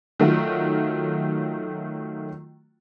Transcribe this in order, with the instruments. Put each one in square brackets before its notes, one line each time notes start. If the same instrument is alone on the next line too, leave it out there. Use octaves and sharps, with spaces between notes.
[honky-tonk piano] D#3 F#3 A3 F4 F#4